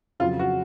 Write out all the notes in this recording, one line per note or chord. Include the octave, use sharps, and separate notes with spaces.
F2 C#3 F#3 F4
F#4